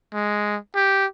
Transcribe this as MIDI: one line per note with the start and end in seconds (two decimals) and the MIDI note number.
0.13 0.57 56
0.75 1.06 67